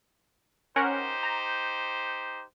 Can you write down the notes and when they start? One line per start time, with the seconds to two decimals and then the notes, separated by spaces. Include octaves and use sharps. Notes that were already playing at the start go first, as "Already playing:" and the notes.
0.76 C#4 D#4 G4 A#4 C5 F#5
1.23 A#5